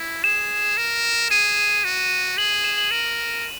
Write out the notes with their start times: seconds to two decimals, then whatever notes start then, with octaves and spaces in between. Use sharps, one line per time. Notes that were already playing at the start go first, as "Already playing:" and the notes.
Already playing: E4
0.24 G#4 E7
0.77 A#4
1.31 G#4 D#7
1.84 F#4
2.38 G#4 F#7
2.64 E7
2.78 F#7
2.91 A#4 E7